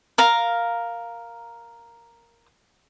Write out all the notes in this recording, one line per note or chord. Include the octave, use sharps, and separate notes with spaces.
A#4 F5 A#5